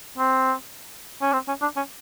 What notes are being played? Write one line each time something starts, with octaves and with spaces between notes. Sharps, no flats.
C4
C#4
C4
C#4
D4
C#4